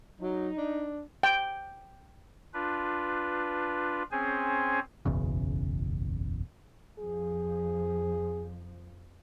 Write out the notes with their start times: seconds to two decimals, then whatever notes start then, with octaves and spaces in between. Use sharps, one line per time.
0.20 F#3 D#4
0.57 D4
1.23 G5
2.54 D4 F4 B4
4.12 C4 C#4 G#4 C5 G#5
5.05 F#1 B1 E2 C#3
6.98 F2 F3 G#4